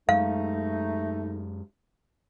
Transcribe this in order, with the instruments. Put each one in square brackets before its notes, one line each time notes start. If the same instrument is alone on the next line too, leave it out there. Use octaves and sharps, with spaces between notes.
[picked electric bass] F#2 G#3 [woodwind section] A3 D#4 [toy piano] F5